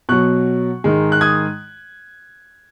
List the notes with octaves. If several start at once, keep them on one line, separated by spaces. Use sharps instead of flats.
B2 F#3 C#6 F#6
G#2 D#3 G#3
F#6
D#6 G#6